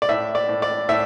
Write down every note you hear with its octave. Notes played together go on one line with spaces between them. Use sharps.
D5
A2 E5
D5
A2
D5
A2 E5